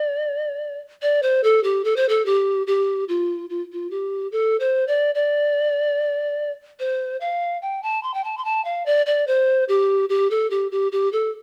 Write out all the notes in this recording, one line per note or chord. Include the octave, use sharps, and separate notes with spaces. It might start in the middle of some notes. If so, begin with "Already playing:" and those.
Already playing: D5
D5
C5
A4
G4
A4
C5
A4
G4
G4
F4
F4
F4
G4
A4
C5
D5
D5
C5
F5
G5
A5
C6
G5
A5
C6
A5
F5
D5
D5
C5
G4
G4
A4
G4
G4
G4
A4